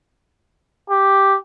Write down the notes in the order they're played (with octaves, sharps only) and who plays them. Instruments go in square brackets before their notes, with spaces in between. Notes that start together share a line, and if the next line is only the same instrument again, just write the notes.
[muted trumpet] G4